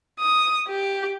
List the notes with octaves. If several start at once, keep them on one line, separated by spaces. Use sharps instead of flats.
D#6
G4